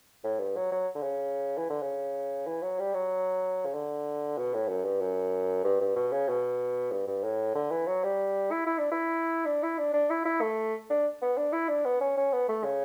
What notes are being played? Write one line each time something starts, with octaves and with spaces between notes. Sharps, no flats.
A2
G2
F#3
F#3
D3
C#3
E3
D3
C#3
E3
F#3
G3
F#3
C#3
D3
B2
A2
F#2
G2
F#2
G2
G2
B2
C#3
B2
G2
G2
A2
D3
E3
F#3
G3
E4
E4
D4
E4
D4
E4
D4
D4
E4
E4
A3
D4
B3
D4
E4
D4
B3
C#4
C#4
B3
A3
C#3